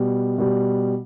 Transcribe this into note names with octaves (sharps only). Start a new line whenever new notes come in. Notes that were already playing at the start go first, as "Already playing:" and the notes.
Already playing: B2 G3
B2 G3